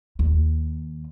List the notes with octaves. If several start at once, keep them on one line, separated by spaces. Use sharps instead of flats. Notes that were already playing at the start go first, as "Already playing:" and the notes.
D#2